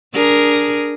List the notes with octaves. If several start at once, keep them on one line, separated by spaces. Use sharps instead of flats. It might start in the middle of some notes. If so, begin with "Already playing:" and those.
D4 G#4 A#4